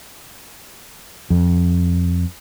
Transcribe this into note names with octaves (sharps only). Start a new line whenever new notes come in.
F2